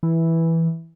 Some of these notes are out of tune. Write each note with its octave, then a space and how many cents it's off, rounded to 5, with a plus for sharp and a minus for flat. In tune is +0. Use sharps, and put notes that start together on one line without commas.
E3 -5